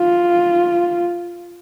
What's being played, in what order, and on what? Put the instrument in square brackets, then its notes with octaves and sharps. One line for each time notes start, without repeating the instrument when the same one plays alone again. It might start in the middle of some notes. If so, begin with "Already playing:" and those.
Already playing: [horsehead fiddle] F4